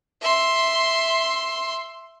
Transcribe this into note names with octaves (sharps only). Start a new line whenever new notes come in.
E5 C6